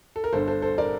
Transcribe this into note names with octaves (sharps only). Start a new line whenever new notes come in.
A4
A#4
G1 G2 D3 A4 C5
A4 C5
A4 C5
A#4 D5